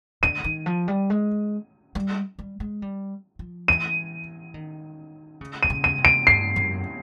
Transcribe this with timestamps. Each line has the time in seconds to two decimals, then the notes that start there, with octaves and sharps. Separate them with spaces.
0.23 D3 D#7
0.44 D#3
0.66 F3
0.88 G3
1.10 G#3
1.95 G3
2.39 G3
2.60 G#3
2.82 G3
3.39 F3
3.68 E3 D#7
4.54 D#3
5.41 C#3
5.63 D#7
5.70 C#3
5.84 D#7
5.98 C3
6.05 D7
6.27 G2 C7
6.56 F#2